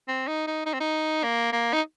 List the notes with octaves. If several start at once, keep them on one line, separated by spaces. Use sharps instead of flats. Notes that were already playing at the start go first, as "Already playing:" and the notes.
C4
D#4
D#4
D#4
C4
D#4
A#3
A#3
D#4